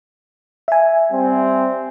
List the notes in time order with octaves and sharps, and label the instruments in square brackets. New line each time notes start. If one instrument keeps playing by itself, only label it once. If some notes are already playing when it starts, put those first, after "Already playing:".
[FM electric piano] E5 G#5
[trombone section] G3 C4